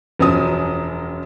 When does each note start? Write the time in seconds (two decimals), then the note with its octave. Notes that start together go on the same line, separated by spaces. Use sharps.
0.19 E1 F#2 F3 F#3 C#4 D#6